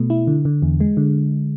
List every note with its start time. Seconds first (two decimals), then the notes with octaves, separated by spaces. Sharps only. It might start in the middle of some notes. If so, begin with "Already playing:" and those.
Already playing: B2 A3
0.10 E4
0.27 D3
0.45 D3
0.62 E2
0.80 G#3
0.97 D3